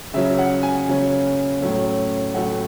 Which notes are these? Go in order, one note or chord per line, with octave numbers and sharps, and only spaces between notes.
C#3 F#3 C#4 E5
F#5
G#5
C#3 F#3 C#4
A2 F#3 A3 C#4
A2 F#3 A3 C#4 F#5